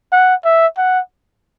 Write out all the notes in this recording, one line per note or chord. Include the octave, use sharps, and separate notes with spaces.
F#5
E5
F#5